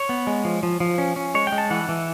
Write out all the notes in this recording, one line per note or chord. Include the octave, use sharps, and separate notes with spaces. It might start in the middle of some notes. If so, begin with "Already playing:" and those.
Already playing: C#5
B3
G#3
F3
F3
F3
C#4
C#4
G#3 C#5
G5
G#3
A5
E3 F#5
E3